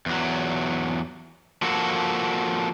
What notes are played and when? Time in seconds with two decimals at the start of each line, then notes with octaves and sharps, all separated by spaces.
0.06 E2 F#3
1.62 F3 A#3 F#4 A4